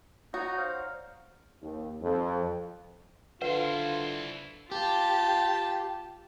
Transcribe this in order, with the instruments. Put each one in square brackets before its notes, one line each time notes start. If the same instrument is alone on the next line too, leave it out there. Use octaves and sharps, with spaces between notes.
[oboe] D#4 [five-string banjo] F#4 [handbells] C#5 F#5 A#5
[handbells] C5 D5 [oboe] F5
[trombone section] D#2
F2
[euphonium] D3 [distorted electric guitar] E4 C5 [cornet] F4 [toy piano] B4 F#5
[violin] F4 A5 [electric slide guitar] G4